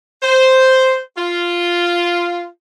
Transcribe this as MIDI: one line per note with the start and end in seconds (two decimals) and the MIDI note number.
0.22 0.99 72
1.17 2.47 65